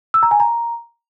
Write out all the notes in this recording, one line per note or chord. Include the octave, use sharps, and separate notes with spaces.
E6
A#5
G#5
A#5